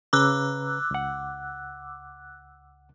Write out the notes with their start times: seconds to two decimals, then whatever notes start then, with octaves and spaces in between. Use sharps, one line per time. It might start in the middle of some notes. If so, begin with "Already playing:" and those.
0.13 C#3 B4 A#5 D6 E6 F#6
0.91 C#2 F#5